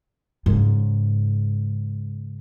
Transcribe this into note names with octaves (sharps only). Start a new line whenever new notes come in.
G#2 C#3